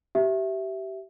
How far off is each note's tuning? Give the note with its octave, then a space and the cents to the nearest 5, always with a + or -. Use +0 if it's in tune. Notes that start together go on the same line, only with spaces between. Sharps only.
G4 -25 E5 +0